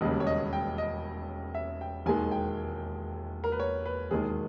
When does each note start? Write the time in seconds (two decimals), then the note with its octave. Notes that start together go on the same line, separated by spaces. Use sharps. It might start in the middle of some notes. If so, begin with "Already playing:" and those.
0.01 E1 D#2 C#3 G3 D#5
0.20 C#5
0.27 D#5
0.53 G5
0.78 D#5
1.55 E5
1.81 G5
2.06 E1 D#2 D#3 G#3 G#5
2.32 G5
3.44 A#4
3.52 B4
3.60 C#5
3.86 B4
4.11 E1 D#2 D#3 G#3 G#4